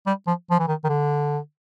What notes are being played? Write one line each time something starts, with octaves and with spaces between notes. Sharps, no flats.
G3
F3
F3
E3
D#3
D#3
D3